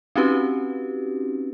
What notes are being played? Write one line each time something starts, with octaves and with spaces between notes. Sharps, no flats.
C4 C#4 D#4 F#4 G4 B4